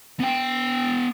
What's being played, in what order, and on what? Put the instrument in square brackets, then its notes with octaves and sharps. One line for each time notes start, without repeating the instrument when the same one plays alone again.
[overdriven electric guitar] B3 G5